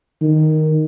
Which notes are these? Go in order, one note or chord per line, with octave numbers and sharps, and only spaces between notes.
D#3